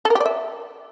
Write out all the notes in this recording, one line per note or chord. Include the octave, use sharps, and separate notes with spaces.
A4
A#4
G4
D5
E5